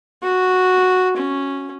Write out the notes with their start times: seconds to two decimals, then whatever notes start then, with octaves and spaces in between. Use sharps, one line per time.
0.22 F#4
1.17 C#4